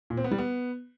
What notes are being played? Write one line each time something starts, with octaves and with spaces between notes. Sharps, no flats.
A#2
C4
B3
G3
B3